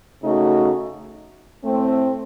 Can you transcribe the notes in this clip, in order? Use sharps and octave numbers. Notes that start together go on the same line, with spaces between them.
C#3 A3 D#4 F#4
A2 A3 C4